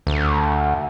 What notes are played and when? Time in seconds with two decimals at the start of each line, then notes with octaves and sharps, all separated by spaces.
0.07 D2